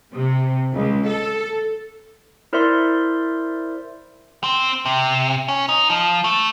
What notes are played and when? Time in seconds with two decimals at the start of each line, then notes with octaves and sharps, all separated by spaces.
0.13 C3
0.75 C#2
1.07 A4
2.53 E4 A#4 C5 D5 E5 C6
4.44 C4
4.85 C3
5.48 C#4
5.69 D#4
5.89 F3
6.24 A3